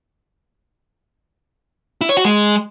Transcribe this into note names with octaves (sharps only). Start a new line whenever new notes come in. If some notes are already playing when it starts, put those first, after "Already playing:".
E4
C#5
F#4
G#3